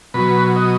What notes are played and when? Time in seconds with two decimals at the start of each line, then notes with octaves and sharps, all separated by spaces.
0.14 B2 F#3 B4
0.56 D#5